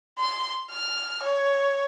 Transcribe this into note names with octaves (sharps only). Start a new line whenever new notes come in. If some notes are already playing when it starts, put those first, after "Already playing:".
C6
F6
C#5